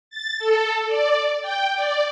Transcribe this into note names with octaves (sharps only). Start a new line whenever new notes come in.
A6
A4
D5
G5
D5